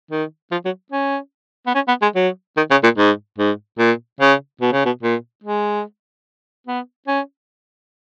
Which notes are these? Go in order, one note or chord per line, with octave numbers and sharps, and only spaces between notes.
D#3
F3
F#3
C#4
B3
C#4
B3
G#3
F#3
D#3
C#3
A#2
G#2
G#2
A#2
C#3
B2
C#3
B2
A#2
G#3
B3
C#4